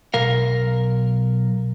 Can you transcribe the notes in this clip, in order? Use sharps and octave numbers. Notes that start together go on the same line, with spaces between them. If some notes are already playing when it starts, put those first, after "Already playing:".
B1 A#4 F5